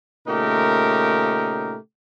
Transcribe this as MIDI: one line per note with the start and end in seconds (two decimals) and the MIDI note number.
0.28 1.77 46
0.28 1.77 49
0.28 1.77 57
0.28 1.77 63
0.28 1.77 67
0.28 1.77 70